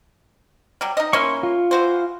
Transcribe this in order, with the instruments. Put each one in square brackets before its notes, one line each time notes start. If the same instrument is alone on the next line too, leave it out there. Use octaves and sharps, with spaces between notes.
[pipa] F#3 G3
D#4 D#5
[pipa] A#3 C#4 E4 [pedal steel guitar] C6 C#6
[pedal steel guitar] F4
[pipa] E3 F#4 C5